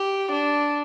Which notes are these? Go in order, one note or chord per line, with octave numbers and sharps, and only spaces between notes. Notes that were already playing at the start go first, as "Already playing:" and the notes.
Already playing: G4
D4